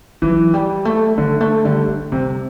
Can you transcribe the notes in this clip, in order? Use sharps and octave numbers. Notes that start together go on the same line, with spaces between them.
E3 F#3
G3
A3
D3 G3
A3
D3 G3
G3
C3 G3